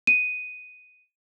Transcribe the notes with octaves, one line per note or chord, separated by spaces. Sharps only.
D#7